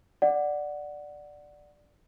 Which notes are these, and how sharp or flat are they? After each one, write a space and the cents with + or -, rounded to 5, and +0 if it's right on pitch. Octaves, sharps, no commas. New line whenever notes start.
D5 +5 F#5 +0